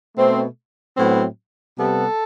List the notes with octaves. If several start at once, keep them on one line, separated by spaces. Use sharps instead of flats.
B2 A3 C4
A2 F#3 B3 C4
C3 G3 B3 A4